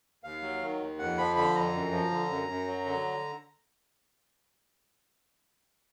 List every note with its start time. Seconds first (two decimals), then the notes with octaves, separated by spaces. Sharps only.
0.24 D#2 F5
0.42 F#3
0.62 D#3
0.80 D#2
0.99 F2 F#5
1.18 F3 B5
1.36 D3 B5
1.55 F2 A#5
1.73 F#2
1.92 F3
2.11 D3
2.29 F#2
2.49 F#2
2.67 F#3
2.86 D3